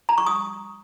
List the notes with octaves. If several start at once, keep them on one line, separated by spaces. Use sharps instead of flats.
A#5
C#6
D#6